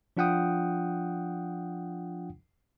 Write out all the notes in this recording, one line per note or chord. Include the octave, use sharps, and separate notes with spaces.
F3 D4 F4 F#5 G5 D#6